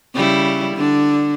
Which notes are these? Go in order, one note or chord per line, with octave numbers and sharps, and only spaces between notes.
C#3 G3 E4
D3 D4